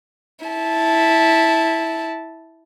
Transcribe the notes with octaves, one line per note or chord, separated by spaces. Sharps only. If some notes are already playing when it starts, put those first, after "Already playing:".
E4 A5